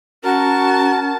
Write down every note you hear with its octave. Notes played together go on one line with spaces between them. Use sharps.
C#4 F#4 A#4 A5